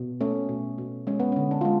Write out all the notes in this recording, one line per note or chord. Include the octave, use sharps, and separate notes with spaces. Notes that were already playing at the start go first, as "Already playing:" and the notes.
Already playing: B2
A3 C#4
B2
B2
G#3 C#4
B3
C#4
D3
D4
G#3 F4